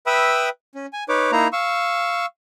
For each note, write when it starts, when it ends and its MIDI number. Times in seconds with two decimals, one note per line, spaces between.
0.06 0.49 71
0.06 0.49 76
0.06 0.49 79
0.06 0.49 83
0.06 0.49 87
0.06 0.49 88
0.75 0.86 61
0.93 1.04 80
1.09 1.31 63
1.09 1.31 71
1.09 1.31 73
1.09 1.31 86
1.32 1.48 58
1.32 1.48 63
1.32 1.48 64
1.32 1.48 82
1.53 2.26 77
1.53 2.26 85
1.53 2.26 88